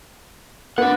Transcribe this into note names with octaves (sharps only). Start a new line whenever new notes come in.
B3 D4 F#5